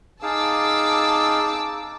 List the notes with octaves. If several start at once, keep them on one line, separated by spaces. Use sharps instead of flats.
D#4 G#4 F5 A5 D6 E6